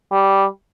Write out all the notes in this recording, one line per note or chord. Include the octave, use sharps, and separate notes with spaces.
G3